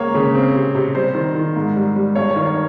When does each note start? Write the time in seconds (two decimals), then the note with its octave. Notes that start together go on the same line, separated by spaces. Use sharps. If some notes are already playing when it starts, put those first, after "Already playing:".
Already playing: C#2 A#3 C#5
0.15 C#3
0.35 C4
0.54 C3
0.75 C3
0.95 G3 C5
1.15 D#3
1.35 D#3
1.56 G#2
1.76 G3
1.96 G3
2.15 G2 C#5
2.31 C#5
2.36 D#3
2.46 C#5